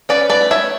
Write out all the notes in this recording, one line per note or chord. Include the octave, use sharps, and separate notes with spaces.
C#4 B4 D5
B4 D5
A3
C#5 E5